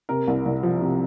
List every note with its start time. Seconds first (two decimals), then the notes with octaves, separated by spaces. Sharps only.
0.09 C3 A#4
0.27 C2
0.45 C2
0.63 F3
0.81 C3